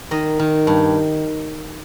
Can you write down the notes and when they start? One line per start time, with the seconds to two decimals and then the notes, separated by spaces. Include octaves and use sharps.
0.11 D#3 D#5
0.39 D#3
0.67 G2